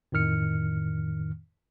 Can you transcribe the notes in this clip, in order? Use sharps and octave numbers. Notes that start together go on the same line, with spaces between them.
F2 A2 D#3 F6 C#7